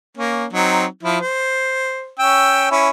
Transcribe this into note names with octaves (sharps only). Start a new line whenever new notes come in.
A#3 C#4
F#3 C4 D#4
F3 E4
C5
C#4 G5 E6
C#4 E4